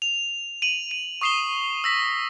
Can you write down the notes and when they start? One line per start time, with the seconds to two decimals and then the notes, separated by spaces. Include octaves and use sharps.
0.02 F7
0.62 D#7 F7 F#7
0.91 D#7
1.21 C#6 D#6 C7 E7 G7
1.84 E6 A#6 B6